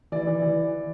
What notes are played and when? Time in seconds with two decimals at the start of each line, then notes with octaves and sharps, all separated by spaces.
0.12 E3 D5
0.27 E3
0.42 E3